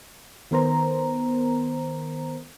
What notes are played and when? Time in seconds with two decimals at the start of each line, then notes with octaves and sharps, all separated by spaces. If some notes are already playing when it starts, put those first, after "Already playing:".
0.51 D#3 B3 A#4 C5 A#5